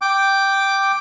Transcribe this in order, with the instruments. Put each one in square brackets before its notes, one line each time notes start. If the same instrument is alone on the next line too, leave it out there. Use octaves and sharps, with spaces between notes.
[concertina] G5 D6